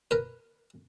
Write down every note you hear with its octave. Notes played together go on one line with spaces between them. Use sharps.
A#4 B4